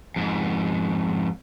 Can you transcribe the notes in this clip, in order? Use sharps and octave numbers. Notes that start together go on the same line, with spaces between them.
F2 G#2